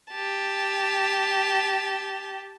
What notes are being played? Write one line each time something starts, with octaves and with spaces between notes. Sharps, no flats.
G4 A5